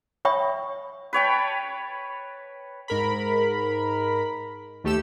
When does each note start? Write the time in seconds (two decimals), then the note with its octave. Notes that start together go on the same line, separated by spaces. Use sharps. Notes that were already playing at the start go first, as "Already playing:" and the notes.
0.25 C#5 E5 G5 B5 C#6 D#6
1.13 B4 C#5 G5 A5
2.88 G#2 A#4 B5
4.84 D#2 A3 G4 A4 E6